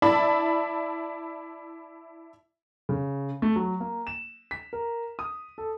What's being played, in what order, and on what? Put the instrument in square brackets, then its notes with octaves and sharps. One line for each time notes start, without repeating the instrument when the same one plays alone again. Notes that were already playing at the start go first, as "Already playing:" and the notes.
[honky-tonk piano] E4 D5 E5 A5 B5
[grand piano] C#3
A3
F#3
A#3
E7
B6
A#4
D#6
A4